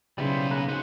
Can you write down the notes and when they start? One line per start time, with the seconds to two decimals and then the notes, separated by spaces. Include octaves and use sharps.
0.18 B1 C#3 G3 B3 E4 C5
0.51 A#3 B4
0.68 D#4 F#4 C5 F#5